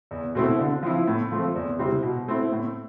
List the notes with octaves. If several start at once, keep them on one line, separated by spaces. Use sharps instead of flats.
E2
B2 A3 C4 E4
D3
F3 C4 E4
A2
F3 A3 C4
E2
C3 G3 C4 E4
B2
A3 C4 E4
A2